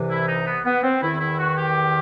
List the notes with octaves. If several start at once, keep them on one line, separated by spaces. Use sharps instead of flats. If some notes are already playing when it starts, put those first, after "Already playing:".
Already playing: C2 C3 E3
E4
D#4
B3
B3
C4
E2 D#3 E4
E4
F#4
G4